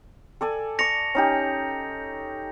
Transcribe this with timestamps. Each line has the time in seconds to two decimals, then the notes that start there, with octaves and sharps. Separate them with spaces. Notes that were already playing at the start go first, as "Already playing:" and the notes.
0.41 A4 D5 G#5
0.79 D5 C#6 A#6 C#7 F7
1.15 C#4 D#4 G4